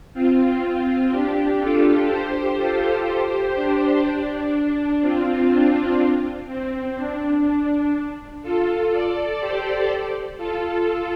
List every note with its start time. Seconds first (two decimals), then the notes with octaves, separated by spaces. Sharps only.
0.14 C4 F4
1.11 D4 G4
1.60 F4 A4
2.09 G4 C5
2.57 F4 A4
3.07 G4 C5
3.55 D4
4.04 D4
5.01 C4 F4
5.50 D4
6.48 C4
6.96 D4
7.45 D4
8.43 F4 A4
8.92 A4 D5
9.40 G4 C5
10.38 F4 A4